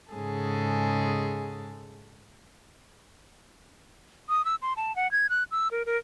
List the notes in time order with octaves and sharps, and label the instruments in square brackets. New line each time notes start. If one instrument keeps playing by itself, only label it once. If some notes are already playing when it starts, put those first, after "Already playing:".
[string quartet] G#2 C#3 G#3 G#4 A4
[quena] D#6
E6
C6
A5
F#5
G#6
F#6
E6
A#4
A#4